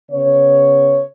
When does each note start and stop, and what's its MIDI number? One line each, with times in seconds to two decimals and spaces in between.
0.12 1.04 49
0.12 1.04 59
0.12 1.04 73